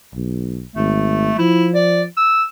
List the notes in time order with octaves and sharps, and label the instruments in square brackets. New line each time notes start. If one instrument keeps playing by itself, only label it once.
[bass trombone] B1
[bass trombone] G#1 [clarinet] A3
[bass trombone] F3 [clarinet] E4
[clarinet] D5
E6